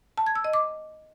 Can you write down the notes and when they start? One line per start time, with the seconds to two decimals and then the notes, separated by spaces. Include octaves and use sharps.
0.18 A5
0.27 G#6
0.36 E6
0.44 D#5
0.53 D6